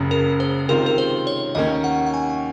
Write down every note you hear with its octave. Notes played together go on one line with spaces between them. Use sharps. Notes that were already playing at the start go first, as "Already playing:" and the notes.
Already playing: F#1 F#2 C#3
A#4
C5
C3 D#3 G#3 C4 F4 A#4
A#4
C5
C#5
D#2 D#3 A#3 C#4 D#5
F#5
F#5
G#5